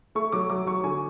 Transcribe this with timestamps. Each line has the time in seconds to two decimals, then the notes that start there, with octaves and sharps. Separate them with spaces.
0.15 A3 C#6
0.32 F#3 D6
0.50 F#3 D6
0.66 F#3 C#6
0.84 D3 G#5